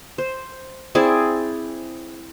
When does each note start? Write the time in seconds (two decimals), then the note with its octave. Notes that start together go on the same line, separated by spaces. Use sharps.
0.18 C5
0.95 C4 E4 G#4 D5